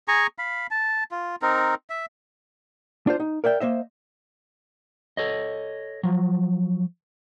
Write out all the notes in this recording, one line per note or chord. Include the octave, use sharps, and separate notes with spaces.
G#4 G#5 A#5 C#6
F5 B5
A5
F4
C4 D#4 A#4
E5
D4 F4 C5
D#4
A#4 D5 E5 G5
A#3 C5 D#5 E5
A4 C#5 D#5
F3 F#3